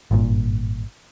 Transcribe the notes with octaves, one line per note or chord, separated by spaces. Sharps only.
G#1 G2 A#2